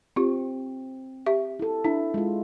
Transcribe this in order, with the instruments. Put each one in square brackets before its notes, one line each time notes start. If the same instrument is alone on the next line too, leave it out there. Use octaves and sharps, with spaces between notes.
[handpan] C4 [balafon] F4 G4
[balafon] G4 E5
[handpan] E4 A4
[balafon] D4 [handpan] E4
[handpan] G#3 F4